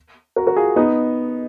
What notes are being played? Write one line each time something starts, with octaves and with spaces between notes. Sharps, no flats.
F#4 A#4
F#4 A#4
F4 G#4
B3 D#4